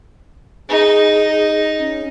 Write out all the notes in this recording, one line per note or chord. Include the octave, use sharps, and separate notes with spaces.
D#4 G#4
C#4